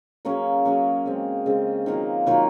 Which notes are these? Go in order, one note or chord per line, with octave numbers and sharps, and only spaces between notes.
F#3 A#3 C#4 G#4
F#3 A#3 C#4 G#4
C#3 G#3 C4
C#3 G#3 C4
D#3 F#3 A#3 F4
D#3 F#3 A#3 F4